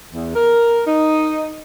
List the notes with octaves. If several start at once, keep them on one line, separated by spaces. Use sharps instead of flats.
E2
A#4
D#4